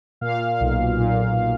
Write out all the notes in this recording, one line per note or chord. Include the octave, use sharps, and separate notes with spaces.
A#2 F5
B1
A#2